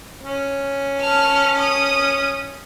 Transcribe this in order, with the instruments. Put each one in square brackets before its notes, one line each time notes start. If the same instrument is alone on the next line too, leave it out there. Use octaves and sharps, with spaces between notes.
[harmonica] C#4
[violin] A5 F6
D#6